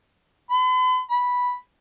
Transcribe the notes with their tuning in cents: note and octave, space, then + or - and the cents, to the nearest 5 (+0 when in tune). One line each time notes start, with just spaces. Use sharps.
B5 +45
B5 -5